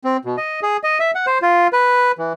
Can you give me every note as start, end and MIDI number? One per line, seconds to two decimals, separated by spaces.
0.04 0.17 60
0.25 0.36 47
0.37 0.60 75
0.63 0.77 68
0.84 0.98 75
1.00 1.11 76
1.15 1.26 78
1.27 1.38 72
1.42 1.67 65
1.73 2.12 71
2.18 2.33 52